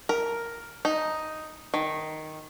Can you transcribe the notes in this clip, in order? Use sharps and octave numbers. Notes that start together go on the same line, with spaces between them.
A#4
D#4
D#3